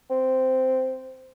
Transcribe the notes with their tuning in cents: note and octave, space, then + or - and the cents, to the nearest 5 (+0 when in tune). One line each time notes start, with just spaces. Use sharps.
C4 -10